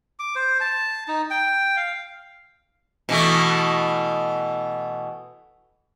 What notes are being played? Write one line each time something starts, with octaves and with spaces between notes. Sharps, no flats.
D6
C5
A5
D#4
G5
F5
B2 E3 A3